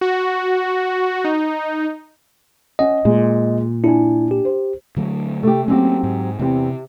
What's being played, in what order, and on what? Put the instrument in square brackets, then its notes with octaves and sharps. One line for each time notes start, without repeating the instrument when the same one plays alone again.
[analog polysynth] F#4
D#4
[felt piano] C#4 F#5 [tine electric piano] D#5
[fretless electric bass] A#2 [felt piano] G#3
[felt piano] D4 G#5 [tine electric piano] E4
[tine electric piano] G4
[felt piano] C5
[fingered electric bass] D3 F#3 A3
[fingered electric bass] C3 [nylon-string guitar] A3 G4
[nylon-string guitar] F#3 C4 G4 [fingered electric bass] A#3 C#4
[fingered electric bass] G#2
[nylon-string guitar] E2 C4 G4 [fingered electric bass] C3